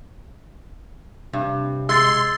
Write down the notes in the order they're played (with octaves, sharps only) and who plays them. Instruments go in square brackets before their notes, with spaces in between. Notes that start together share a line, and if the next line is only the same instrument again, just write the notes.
[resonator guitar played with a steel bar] G2 [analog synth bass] C3
[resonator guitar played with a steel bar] G#3 [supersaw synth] C6 [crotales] E6 G#6 A6